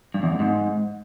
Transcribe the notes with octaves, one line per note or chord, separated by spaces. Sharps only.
G2
E2
F2
G#2